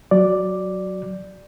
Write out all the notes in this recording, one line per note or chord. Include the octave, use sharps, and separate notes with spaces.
F#3 D5